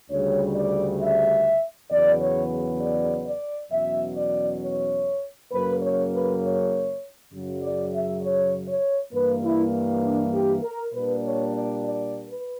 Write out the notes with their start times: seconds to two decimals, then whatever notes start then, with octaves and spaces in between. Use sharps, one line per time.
0.10 D2 C#3 G3 C#5
0.56 D5
1.01 E5
1.90 E2 C#3 F#3 B3 D5
2.21 C#5
2.81 D5
3.26 D5
3.71 E2 B2 F#3 C#4 E5
4.17 D5
4.62 C#5
5.52 F#2 C#3 F#3 A#3 B4
5.82 C#5
6.12 B4
6.42 C#5
7.32 F#2 C#3 F#3
7.62 D5
7.93 E5
8.23 C#5
8.67 C#5
9.13 G2 E3 A#3 B4
9.43 E4
10.03 D4
10.33 G4
10.63 A#4
10.93 A#2 G3 A#3 D4 B4
11.24 C#5
11.54 D5
11.84 D5
12.29 B4